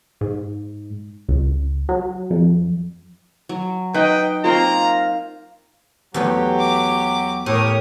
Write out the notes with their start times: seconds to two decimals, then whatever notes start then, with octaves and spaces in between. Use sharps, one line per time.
0.21 G#2
1.28 C#2
1.89 F#3
2.30 F2
3.49 F#3
3.94 D#4 B4 D#5 G5
4.44 A#3 C4 F4 A#5
6.14 E2 F#3 A3 G4 B4
6.60 D6
7.46 A2 G4 A#4 C#5 D#6